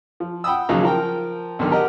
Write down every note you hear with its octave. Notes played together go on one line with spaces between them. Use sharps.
F3
F#5 G5 B5 D#6 E6
D#2 C#3 F3 F#3 D#4
F3 A#4 G5
B1 D3 D#3
G4 A#4 D#5 F#5